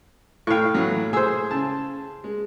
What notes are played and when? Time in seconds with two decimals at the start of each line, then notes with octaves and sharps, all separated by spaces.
0.47 A2 F5 G5 C#6
0.74 E3 F#3
1.13 G#4 C5 G#5 E6
1.50 C#3 A5
2.24 G#3